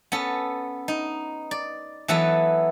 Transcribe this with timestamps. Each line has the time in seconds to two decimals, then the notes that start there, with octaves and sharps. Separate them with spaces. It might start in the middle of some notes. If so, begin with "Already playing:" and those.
0.12 B3 C#4 A4
0.88 D#4
1.51 D5
2.08 E3 F#3 B3 A4